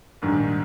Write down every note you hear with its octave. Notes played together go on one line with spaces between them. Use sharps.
A#1 G#2 D#3 G3